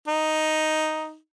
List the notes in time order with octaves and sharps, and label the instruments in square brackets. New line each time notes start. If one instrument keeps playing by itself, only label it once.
[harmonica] D#4